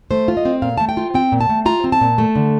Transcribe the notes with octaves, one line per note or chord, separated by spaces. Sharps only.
A3 C5
F4
D#5
C4
A#2 F5
A3 A5
G5
F4
C4 G5
A#2
A5
A3
F4 A#5
C4
A5
A#2
A3
D3